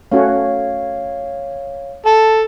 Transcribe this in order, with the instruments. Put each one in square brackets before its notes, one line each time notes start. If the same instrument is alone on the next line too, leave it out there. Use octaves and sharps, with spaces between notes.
[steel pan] A3 C#4 F#4 [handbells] C#5 F5
[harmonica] A4 [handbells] A5